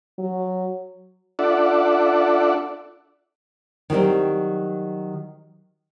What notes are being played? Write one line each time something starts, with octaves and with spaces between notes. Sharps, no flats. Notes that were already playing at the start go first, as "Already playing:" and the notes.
F#3
D4 F4 A4 D5 E5 F#5
D#3 F#3 G3 C4